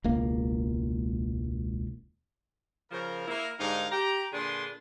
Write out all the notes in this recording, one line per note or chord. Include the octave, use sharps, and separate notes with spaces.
E1 C#2 A#3
C#3 F3 A#4
A#3 E4 A#4
G#2 D3 G3 D#4 A#4 F5
G4 A#5
A#2 D3 D4 G#4 B4 C6